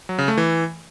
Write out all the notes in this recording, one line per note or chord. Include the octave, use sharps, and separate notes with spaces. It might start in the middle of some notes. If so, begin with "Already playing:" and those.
F#3
C#3
A3
E3